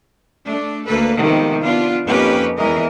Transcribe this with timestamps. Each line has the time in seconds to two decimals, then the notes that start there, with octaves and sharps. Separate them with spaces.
0.46 A3 D4
0.86 D2 A#3 A4 B4
1.19 C3 D#3 F3 G#3 A3 B3
1.63 B3 D4 F4
2.05 F2 A#3 C#4 D#4 G4 B4
2.58 E2 E3 G#3 A#4 D#5